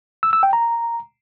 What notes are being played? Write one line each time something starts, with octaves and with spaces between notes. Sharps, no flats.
E6
E6
G5
A#5